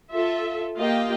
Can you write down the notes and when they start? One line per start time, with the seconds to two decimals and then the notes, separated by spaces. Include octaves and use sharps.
0.11 F4 A4 E5
0.78 A#3 F4 G4 D#5 F5 G5